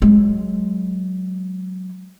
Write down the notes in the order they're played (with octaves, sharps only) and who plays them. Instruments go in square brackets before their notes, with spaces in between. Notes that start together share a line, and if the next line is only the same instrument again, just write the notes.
[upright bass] F#3 G#3